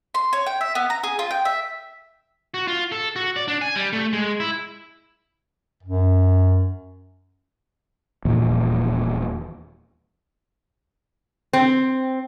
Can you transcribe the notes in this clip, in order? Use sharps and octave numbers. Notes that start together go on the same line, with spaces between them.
C6
C#5
G5
E5
B3
A#5
G#4
F4
G5
E5
F#4
F4
A4
F#4
D5
D4
G#5
G3
A3
G#3
E4
F#2
D#1 E2 A#2 F3
C4